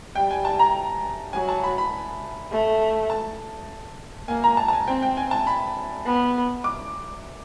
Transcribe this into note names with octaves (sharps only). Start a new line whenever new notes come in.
G3 G5
G#5
A5
A#5
F#3 G#5
A5
B5
B5
A3
A5
A#3 G#5
A#5
A5
A5
G#5
C4 G5
G5
G#5
A5
B5
B3
D6